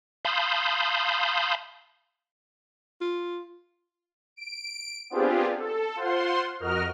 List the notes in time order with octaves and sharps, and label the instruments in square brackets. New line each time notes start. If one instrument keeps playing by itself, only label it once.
[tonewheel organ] F5 A5 B5 C6 D#6 G6
[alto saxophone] F4
[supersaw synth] D7
B3 C4 D4 F4 G4 G#4
A4
F4 C5 F#5 C6
F2 F#4 A#4 D#5 F6